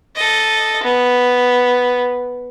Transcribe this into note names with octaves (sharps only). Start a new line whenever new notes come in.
A4 D#5
B3